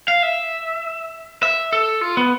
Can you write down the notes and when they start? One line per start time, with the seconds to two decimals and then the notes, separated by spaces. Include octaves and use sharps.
0.08 F5
0.23 E5
1.43 E5
1.73 A4
2.01 F4
2.17 B3